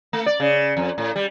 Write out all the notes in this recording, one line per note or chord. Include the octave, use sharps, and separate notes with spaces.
A3
D5
C#3
F2
A2
G3